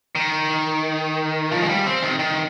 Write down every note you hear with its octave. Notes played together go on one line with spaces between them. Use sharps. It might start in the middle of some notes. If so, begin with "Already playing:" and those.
D#3
F3
G#3
G3
C4
D#3
D#3